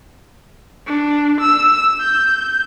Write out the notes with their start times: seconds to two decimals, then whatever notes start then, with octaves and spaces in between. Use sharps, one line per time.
0.87 D4
1.41 E6
2.01 G6